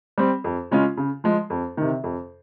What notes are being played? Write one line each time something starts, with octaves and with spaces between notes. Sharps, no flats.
G3 C4
F2
C#3 G#3 C#4 F4
C#3
F3 G#3
F2
C3 D#3
F2